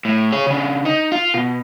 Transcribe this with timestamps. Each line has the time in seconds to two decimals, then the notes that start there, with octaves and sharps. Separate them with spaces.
0.05 A2
0.32 G#4 C#5
0.47 C#3 D4
0.85 D#4
1.12 F4
1.34 B2